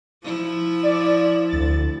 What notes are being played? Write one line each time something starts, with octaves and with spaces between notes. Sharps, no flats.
F3 E4
D5
D2 A6